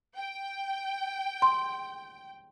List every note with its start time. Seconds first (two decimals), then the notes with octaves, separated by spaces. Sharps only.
0.16 G5
1.42 C6